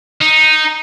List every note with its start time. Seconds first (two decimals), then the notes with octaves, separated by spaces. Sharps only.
0.22 D#4